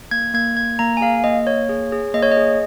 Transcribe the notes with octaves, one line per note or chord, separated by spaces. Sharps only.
A#3 G#6
A#3 G#6
A#3 G#6
A#3 A#5
G#5
G#4 F5
A#3 D#5
A#3 C#5
G#4
G#4
A#3 D#5
C#5
D#5
G#4